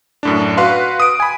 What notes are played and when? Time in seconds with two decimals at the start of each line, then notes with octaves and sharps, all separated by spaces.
0.23 F#2 A2 D4
0.57 F#4 B4 F5 C6
1.00 D#6 D7
1.20 G#5 B5